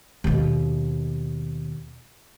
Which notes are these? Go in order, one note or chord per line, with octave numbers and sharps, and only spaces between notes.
D#2 B2